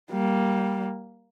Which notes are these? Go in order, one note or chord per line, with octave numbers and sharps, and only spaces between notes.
G3 A#3